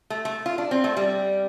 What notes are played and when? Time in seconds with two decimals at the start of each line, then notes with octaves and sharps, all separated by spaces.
0.10 A3
0.25 A3
0.46 F4
0.58 D4
0.71 C4
0.84 A3
0.97 G3